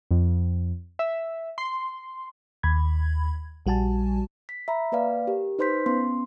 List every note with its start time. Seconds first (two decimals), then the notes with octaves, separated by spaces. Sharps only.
0.11 F2
0.99 E5
1.58 C6
2.63 D#2 B5 G#6
3.66 A#1 G3 F#4 G#5 A5
4.49 B6
4.68 E5 A#5 B5
4.92 A#3 B4 D5 F5
5.27 G4 A#4
5.59 D#4 B4 C5 C6 G6 B6
5.86 B3 C#4 C6